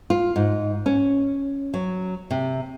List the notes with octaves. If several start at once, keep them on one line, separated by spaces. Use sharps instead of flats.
F4
G#2
C#4
F#3
C3